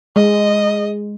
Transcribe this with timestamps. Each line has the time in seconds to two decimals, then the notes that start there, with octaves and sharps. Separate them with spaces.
0.16 G#3 D#5